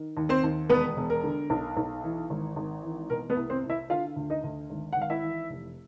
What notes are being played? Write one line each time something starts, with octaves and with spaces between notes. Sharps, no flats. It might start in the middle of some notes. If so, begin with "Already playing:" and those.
Already playing: D#3
D#2
C4 C5
D#2
E1 B3 B4
E1
A#4
D3
B1
B1
E3
G#1
G#1
E3
B2 A#4
B3 B4
C2
C4 C5
C2
E4 E5
D3 F4 F5
D2
D#4 D#5
D2
G#1
F#5
G#1 F5
E4 E5
E3
F1